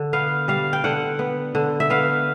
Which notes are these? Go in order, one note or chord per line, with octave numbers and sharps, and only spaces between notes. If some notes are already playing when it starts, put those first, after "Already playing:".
Already playing: D3
B3 F5
G3 F5
G5
D3 F#5
B3
D3
E5
B3 F5